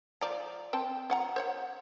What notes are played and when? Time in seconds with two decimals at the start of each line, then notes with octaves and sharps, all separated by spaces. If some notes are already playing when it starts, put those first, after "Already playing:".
0.21 F3 D5 A#5
0.73 C4 G5 A5
1.10 F3 F#5 A#5
1.36 C5 C#5 F#5